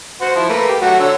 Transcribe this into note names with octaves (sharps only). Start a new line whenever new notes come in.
F#4 C5 F#5
F3 E4
A3 A#3 B4
G4
F#3 A3 F#4
D3 C#5 E6